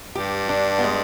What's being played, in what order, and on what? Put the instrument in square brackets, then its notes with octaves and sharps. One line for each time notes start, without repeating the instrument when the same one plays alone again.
[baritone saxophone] G2 [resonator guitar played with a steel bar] G4
[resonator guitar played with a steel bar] D4
B3
G#3